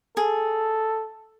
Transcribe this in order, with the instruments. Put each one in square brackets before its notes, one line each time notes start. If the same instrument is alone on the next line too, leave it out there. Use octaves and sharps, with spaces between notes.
[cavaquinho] G#4 [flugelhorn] A4